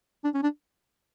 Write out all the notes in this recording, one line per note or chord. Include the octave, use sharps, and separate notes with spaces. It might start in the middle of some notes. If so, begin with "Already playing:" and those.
D4
C#4
D4